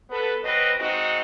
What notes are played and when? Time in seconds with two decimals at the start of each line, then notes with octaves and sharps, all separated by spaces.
0.10 B3 A4 B4
0.43 F#3 C4 B4 D#5
0.79 G#3 C4 D#4 F#4